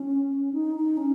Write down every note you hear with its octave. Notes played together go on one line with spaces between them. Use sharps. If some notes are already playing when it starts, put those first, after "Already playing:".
Already playing: C#4
D#4
D#4
C#4